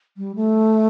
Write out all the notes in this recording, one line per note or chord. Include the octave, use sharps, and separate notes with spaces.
G3
A3